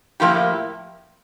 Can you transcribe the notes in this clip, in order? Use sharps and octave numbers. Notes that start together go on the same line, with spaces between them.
A2 F3 A#3 E4 G4